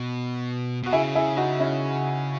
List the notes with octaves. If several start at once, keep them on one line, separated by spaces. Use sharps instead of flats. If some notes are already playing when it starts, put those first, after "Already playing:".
Already playing: B2
B2 F#4
C#3 E4 G#4
E4 G#4
D#4 F#4
C#4 E4